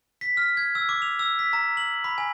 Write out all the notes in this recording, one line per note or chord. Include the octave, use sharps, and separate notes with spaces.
B6
F6
G#6
E6
D6
F7
E6
B6
A#5
F#7
B5
G#5